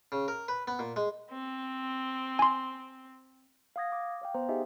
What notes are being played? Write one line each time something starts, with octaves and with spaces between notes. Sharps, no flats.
C#3
A#4
B4
B3
A#2
G#3
C4
G#5 C6
F5 F#5 D#6 G#6 A#6
D6
C#5 F5 G5
B3 C5 A#5
D#4 G4 G#4 D#5 E5 G#5